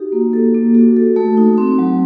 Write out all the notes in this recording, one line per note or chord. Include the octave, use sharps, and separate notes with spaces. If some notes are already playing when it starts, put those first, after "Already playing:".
Already playing: D#4 F#4 G4
A#3
A4
A#3
F#4
A4
A3
D#4
C4
F#3